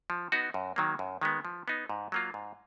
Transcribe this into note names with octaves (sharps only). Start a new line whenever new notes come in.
F3
B3 D#4 F#4
F#2
D#3 F#3 A#3
F#2
D#3 G#3 B3
F3
B3 D#4
G#2
F#3 A#3 F4
G#2